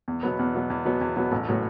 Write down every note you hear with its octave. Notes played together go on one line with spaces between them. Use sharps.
E2
B2 F#3 B3
E2
B2 F#3 B3
E2
B2 F#3 B3
E2
B2 F#3 B3
A1
A2 F#3 B3